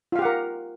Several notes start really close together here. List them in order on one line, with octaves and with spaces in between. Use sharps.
F4 F5 G4 F#5 A#4